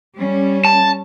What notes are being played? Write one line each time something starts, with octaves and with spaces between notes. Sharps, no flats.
G3 C#4
A5